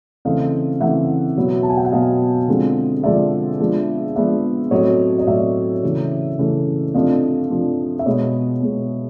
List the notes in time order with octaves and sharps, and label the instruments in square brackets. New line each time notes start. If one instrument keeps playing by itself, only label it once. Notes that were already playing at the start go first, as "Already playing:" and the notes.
[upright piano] C#3 E3 A3 C4 D#5 F5
C#3 E3 A3 C4 E5 F#5
B2 F#3 B3
A5
G#5
G5
F#5
B2 F#3 B3 D#5 F5
D3 F3 G#3 C4
D3 F3 G#3 C4 D5 E5
F3 G#3 B3 D4
F3 G#3 B3 D4 D5 E5
A2 F#3 A3 C4 C#5 D#5
D#5
A2 F#3 A3 C4 D5 E5
C#3 E3 A3
C#3 E3 A3
C3 F3 A3 D4 D#5 F5
C3 F3 A3 D4
E5
B2 G#3 B3 C#5 D#5
B2 G#3 B3